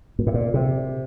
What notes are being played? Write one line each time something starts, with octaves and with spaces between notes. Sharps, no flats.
A#2
A2
A#2
C3